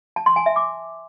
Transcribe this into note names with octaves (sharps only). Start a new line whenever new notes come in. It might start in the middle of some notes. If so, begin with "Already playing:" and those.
A5
C6
G#5
E5
D6